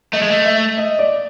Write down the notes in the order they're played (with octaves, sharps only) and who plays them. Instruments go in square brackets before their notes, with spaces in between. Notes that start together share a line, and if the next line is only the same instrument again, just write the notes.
[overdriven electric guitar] A3 [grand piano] D#5
[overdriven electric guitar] G#3
A3
[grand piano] E5
D#5
D5